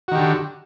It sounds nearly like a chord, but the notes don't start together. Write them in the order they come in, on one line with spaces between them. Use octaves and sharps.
F#4 D#3 G4 D3